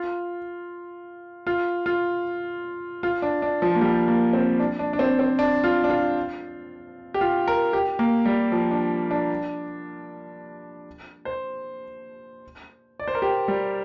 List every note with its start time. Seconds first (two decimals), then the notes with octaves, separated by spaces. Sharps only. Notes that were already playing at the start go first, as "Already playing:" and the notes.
Already playing: F4
1.47 F4
1.86 F4
3.03 F4
3.22 D4
3.42 D4
3.62 F3
3.75 A#3
3.81 G3
4.08 A#3
4.33 C4
4.60 D4
4.79 D4
4.93 D4
4.99 C4
5.19 C4
5.39 D4
5.64 F4
5.84 D4
5.90 F4
7.14 G4
7.21 F4
7.48 A#4
7.73 G4
7.99 A#3
8.26 G3
8.52 F3
8.71 D4
9.11 D4
11.25 C5
13.00 D5
13.08 C5
13.15 A#4
13.22 G4
13.48 G3